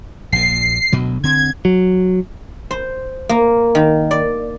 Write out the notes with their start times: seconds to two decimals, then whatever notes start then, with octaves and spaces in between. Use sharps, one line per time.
0.32 A#1 A#2 C7
0.92 D2 B2 F#3
1.24 D3 C4 G#6
1.65 F#3
2.71 C5
3.29 A#3
3.75 D#3
4.11 D5